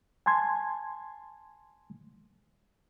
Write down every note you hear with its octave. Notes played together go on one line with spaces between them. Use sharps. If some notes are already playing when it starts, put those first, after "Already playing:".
G#5 A5 C6 G#6